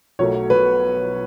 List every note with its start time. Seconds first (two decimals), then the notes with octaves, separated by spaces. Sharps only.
0.19 B1 B2 F#3 A3 C#5
0.50 B4